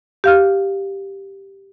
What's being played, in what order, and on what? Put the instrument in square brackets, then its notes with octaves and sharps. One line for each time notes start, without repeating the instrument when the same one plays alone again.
[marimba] G4 F5 F6